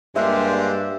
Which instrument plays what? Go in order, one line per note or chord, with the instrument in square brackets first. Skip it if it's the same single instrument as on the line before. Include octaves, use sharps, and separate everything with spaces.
[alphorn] G2 [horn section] G#3 A#3 G4 [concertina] D4 C5 [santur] E5